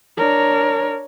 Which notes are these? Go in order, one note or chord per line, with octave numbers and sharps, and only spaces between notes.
D4 A#4 C#5